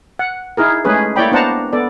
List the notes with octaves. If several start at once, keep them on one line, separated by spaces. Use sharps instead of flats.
F#5
D#4 E4 G#4 A#4
G#3 A3 C#4 G#4 B4
A#3 E4 C#5 D5 G5 B5
B3 D4 C5 F#5 A5 A#5
B3 A4 D5